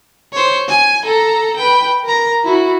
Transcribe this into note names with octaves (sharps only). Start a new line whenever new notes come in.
C5 C#5
G#5 G#6
A4 A#5
B4 G5
A#4 A#5
E4 F#4